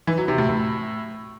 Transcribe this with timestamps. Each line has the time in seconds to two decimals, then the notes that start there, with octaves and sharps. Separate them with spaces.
0.07 E3
0.18 F#3
0.28 C3
0.38 A2
0.49 A2